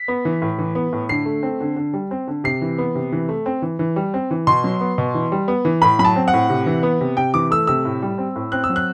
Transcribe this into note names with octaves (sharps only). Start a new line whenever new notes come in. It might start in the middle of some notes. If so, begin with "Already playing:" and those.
Already playing: B6
B3
E3
A2
E3
B3
A2
D3 C7
A3
C4
D3
D3
G3
C4
D3
C3 C7
E3
B3
C3
E3
A3
C4
E3
E3
G3
C4
E3
B2 C6
F#3
B3
B2
E3
G3
B3
E3
A2 B5
F#3 B5
A5
C4
F#5
A2
C3
E3
B3
C3
C3 G5
E3 D6
A3 E6
C3 E6
A2
G3
C4
A2
C4 F#6
E6
F#3
F#6